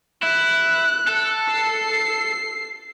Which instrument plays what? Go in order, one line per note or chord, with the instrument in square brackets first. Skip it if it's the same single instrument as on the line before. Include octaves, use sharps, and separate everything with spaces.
[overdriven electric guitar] E4 [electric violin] F#6
[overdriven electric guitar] A4
[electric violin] C7